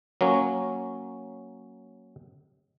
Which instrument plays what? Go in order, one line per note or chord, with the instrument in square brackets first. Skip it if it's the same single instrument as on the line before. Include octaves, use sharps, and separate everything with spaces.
[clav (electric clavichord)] F#3 A#3 C#4